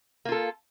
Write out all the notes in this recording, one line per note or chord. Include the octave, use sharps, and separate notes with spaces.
A#3 F4 A4